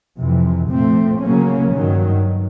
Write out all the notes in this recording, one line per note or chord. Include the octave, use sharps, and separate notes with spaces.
F2 C3 E3
A#2 F3 A3 C4
C#3 F#3 A#3 C#4
G2 D#3 F#3